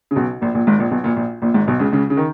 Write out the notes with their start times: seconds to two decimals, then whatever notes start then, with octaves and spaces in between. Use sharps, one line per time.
0.11 C#3
0.16 B1 B2
0.41 A#1 A#2
0.54 A#1 A#2
0.67 G#1 G#2
0.79 A#1 A#2
0.91 B1 B2
1.04 A#1 A#2
1.16 A#1 A#2
1.42 A#1 A#2
1.54 G#1 G#2
1.68 B1 B2
1.79 C#2 C#3
1.92 C#2 C#3
2.10 C#3
2.17 D#3